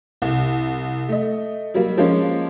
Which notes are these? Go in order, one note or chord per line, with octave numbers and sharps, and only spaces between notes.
C2
A3 D#5
F#3 G3 A#3
F3 G#3 A#3 C#4